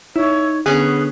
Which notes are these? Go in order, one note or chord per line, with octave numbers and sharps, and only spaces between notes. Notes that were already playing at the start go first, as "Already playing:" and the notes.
D#4 E4 C#5
D3 B3 C#4 G#4 F#6